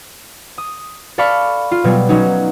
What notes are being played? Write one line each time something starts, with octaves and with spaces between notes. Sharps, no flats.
D#6
A4 D5 F5 B5 C#6
F4
B2 F#3 G3
F#3 C#4 D#4 F#4